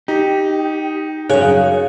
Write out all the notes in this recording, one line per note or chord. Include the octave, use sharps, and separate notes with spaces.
D#4 G4
F#2 C#3 G#4 C#5 F#6